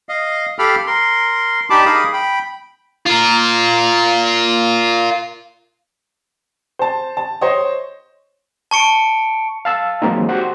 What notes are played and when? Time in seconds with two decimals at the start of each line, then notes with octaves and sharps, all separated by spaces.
0.09 D#5 F5
0.59 G4 A4 F5 G5 B5 F6
0.87 A#4 C6
1.70 D4 D#4 G4 A5 B5 D6
1.85 D#4 G#4 A#4 F5 B5 D#6
2.13 G5 B5
3.06 F4 A#4
6.79 C5 A5
7.17 A5
7.41 C5 C#5 D#5
8.71 A5 C#6 C#7 D7
9.65 F5 A5 E6
10.02 E3 F#3 G#3 A#3 C4 D#4
10.29 F#4 G4 C5 F#5